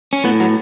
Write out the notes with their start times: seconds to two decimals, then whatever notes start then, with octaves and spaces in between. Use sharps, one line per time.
0.13 C#4
0.24 A2 B3
0.40 F#3